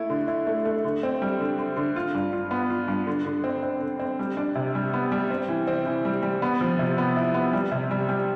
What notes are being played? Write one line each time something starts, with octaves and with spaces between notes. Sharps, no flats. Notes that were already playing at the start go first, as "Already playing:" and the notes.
Already playing: A3 E4
D3
E4
A3
A3
D3
C4
G3
D3
D3
D3
F4
G2
F4
B3
F4
G2
D3
D3
C4
C4
D3
C4
G3
D4
C3
G3
B3
G3
C4
E3
C4
E3
G3
G3
B3
F3
C3
B3
E4
B3
G3
C3
G3
G3